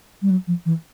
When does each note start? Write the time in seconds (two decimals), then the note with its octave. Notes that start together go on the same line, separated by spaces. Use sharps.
0.22 G3
0.30 F#3
0.47 F3
0.66 E3